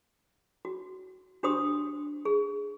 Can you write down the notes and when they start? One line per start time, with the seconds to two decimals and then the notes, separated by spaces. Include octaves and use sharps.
0.65 F#4
1.43 D4 F#4 G4 C5 C6 D#6
2.25 G#4